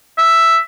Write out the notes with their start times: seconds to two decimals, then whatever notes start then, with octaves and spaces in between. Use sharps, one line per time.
0.18 E5